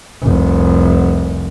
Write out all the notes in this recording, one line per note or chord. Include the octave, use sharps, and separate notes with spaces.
F1 C2